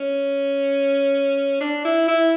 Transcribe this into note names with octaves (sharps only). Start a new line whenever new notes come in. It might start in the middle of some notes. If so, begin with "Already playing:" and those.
Already playing: C#4
D4
E4
E4